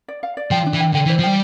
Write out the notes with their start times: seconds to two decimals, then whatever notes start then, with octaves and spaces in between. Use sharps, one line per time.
0.08 D5
0.23 F5
0.37 D5
0.51 F3 G5
0.66 D4
0.73 E3
0.80 G5
0.94 D3 G5
1.06 E3
1.09 C5
1.19 F3
1.24 G3 G5